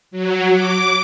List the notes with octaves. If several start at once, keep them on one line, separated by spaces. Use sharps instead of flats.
F#3
D6